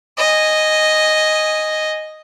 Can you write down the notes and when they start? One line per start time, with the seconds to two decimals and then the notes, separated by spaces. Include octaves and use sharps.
0.18 D#5 G#5